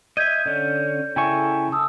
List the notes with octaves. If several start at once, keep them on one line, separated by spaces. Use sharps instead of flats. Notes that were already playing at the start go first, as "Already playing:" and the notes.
D#5 E5 G6 G#6 D#7
D3 C#4 D5 G6
C#3 E4 A4 G5 G#5 C#6
A5 D#6 E6